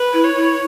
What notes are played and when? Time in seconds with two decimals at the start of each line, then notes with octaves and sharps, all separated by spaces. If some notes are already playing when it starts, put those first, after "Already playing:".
Already playing: B4
0.13 E4
0.24 C#5
0.37 E4